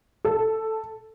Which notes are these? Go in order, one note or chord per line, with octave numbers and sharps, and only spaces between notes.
A4